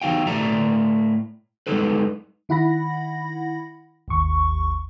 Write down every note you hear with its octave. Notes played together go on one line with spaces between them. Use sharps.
E3 D#4 F#4 F5 G5
A2 A3 D5 E5 A#5
G3 G#3 D#4 A4 B4
D#3 E4 F#5 B5 A#6
G#1 D#2 C#6